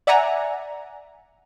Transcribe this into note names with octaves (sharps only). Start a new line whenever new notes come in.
D5 E5 F#5 G#5 A#5